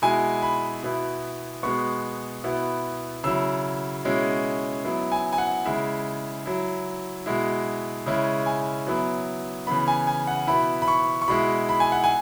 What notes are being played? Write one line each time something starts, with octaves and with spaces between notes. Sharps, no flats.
B2 G#3 E4 G#5
B5
B2 B3 E4
B2 G#3 B3 C#6
B2 B3 E4
C#3 F#3 E4 E6
B2 G#3 C#4 E4
F#3 B3 E4
G#5
G#5
F#5
C#3 G#3 E4 E5
F#3 E4
B2 G#3 E4
C#3 G#3 C#4 E4
G#5
F#3 B3 E4
C#3 E3 B3 B5
G#5
G#5
F#5
B2 B3 E4 B5
B5
C#6
C#6
B2 G#3 E4 B5
B5
G#5
F#5
G#5